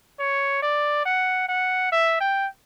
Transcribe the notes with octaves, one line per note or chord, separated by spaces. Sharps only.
C#5
D5
F#5
F#5
E5
G5